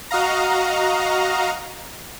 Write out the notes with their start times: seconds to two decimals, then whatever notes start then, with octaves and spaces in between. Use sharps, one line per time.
0.11 F#4 D#5 F5 A#5